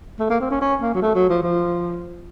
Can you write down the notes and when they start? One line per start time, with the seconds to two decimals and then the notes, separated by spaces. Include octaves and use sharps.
0.20 A3
0.30 A#3
0.40 C4
0.51 C#4
0.61 C#4
0.82 A#3
0.95 F#3
1.02 A3
1.15 F#3
1.30 F3
1.43 F3